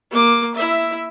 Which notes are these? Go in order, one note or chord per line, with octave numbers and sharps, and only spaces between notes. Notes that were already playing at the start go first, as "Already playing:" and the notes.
A#3 D6
E4 E5